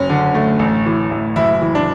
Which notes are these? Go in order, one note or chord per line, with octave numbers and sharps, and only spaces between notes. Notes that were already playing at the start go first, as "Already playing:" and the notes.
Already playing: F#1 C#4
D3
A3
A1
E3
A1
F#1 E4
E3
D4